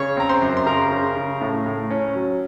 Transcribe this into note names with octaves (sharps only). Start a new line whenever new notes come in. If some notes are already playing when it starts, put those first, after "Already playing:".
Already playing: C#3 C#5 C#6
C4 A#5
C5 C6
F#2
C6
C#3 A#4 A#5
C#3
C#3
A2
A2
C#4
F#3